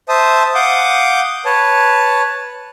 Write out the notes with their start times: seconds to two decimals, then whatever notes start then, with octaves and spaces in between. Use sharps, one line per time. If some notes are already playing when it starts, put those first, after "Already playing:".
0.09 C5 E5 A5 D#6
0.55 F5 F#5 D6 D#6 G6
1.45 B4 C#5 A5